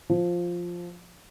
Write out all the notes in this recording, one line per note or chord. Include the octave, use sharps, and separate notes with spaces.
F3